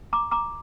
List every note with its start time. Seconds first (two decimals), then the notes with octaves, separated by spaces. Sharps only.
0.13 A#5 D6
0.31 A#5 D6